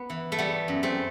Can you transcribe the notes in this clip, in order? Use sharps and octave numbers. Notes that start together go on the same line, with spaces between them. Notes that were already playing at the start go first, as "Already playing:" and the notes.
Already playing: B3
E3
A3
G3 B3
F#2
A3 C4